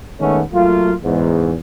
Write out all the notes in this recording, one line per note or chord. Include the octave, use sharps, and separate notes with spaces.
D#3 G#3 A3 B3 C#4
F#3 A3 A#3 F4
E2 G#2